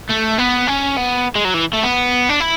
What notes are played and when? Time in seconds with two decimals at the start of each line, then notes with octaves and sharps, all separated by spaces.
0.10 A3
0.39 B3
0.68 C#4
0.97 B3
1.35 G#3
1.45 F#3
1.54 E3
1.73 A3
1.83 B3
2.29 D4
2.40 E4